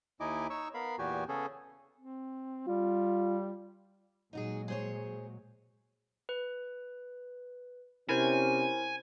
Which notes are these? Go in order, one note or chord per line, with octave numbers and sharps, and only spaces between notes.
D#2 D#4 E4 D#5 G#5 D6
D#4 C#5 C#6 E6
B3 A#4 F5 B5
E2 A#2 B3 F#4 G4 G#5
C#3 B3 C#4 G#4 A4
C4
G3 F4
A#2 F#3 G#3 D#4 F#4 G#4
G#4 C5 C#5
B4
C3 C#4 E4 A#4 C5 G#5